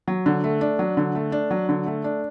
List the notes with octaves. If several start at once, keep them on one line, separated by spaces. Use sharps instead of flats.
F#3
D3
A3
D4
F#3
D3
A3
D4
F#3
D3
A3
D4